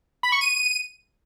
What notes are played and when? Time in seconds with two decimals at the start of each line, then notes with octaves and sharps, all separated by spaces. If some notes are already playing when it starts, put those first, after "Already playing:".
0.23 B5
0.32 C#6
0.41 D#7